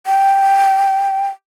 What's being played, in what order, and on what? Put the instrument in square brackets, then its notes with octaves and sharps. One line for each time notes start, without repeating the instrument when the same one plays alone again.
[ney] G5